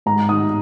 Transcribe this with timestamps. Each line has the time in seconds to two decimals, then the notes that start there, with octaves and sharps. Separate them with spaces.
0.06 G#2 A#5
0.29 D#4 D#6